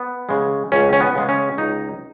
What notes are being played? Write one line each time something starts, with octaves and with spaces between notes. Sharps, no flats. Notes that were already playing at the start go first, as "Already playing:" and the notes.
Already playing: B3
C#3 G#3
C#2 C#4
C#4
B3
C#3 G#3
C#4
C#2 D#4